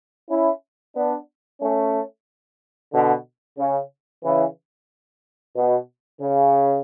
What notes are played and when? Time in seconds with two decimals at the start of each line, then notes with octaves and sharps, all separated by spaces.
0.31 C#4 E4
0.96 B3 D4
1.61 A3 C#4
2.93 B2 D3
3.59 C#3
4.24 C#3 E3
5.56 B2
6.22 C#3